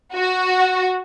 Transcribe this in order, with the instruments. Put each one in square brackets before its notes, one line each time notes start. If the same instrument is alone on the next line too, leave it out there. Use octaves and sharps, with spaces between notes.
[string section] F#4